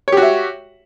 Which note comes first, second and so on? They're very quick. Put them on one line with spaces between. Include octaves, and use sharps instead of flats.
C#5 G4 F#4 E5